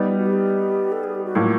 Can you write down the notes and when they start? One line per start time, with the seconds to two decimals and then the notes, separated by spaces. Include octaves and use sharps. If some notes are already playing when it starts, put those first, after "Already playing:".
Already playing: G3 B3 D#4
0.09 F4
0.18 F#4
0.26 G4
0.92 A4
1.04 G#4
1.15 G4
1.25 F#4
1.35 A2 F#3 A#3 F4